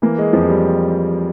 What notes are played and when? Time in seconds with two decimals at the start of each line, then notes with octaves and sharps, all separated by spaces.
0.02 E3 A#3
0.18 G#3
0.33 F2 F3
0.49 G3